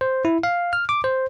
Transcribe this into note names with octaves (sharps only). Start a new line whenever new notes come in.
C5
E4
F5
F6
D6
C5